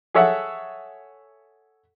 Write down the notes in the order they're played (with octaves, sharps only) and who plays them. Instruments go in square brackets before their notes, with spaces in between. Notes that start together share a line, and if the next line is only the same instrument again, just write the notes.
[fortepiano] G#4 A4 C#5 E5 F#5